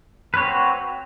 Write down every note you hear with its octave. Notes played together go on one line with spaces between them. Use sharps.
C4 F#4 B4 C#5